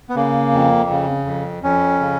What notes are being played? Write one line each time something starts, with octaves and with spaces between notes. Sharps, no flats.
B3
C#3 A#3
F2
C#3
F2
F2 C#4
C#3